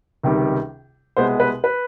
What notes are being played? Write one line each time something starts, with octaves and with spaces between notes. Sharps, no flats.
C#2 C3 D#3 G3
C2 B2 G#3 B3 C5
B4
B4